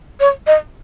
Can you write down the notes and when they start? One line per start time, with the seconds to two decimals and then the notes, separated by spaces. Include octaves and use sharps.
0.20 C#5
0.47 D#5